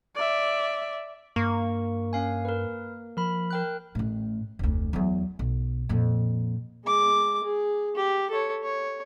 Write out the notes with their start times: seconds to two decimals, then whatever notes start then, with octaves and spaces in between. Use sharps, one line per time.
0.15 D5 E5
1.36 G2 A#3 C#6
2.13 C#4 F5 G#5
2.45 A#4 B4
3.17 F3 A#4 B5
3.51 A#4 G5 F#6
3.95 A1 A2
4.59 F1 D2
4.93 E2 F#3
5.39 B1
5.89 F2 A#2
6.84 G#3 D6
7.43 G#4
7.95 G4
8.30 A4 C#5
8.63 C#5